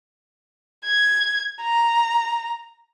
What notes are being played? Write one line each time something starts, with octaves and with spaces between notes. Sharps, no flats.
G#6
A#5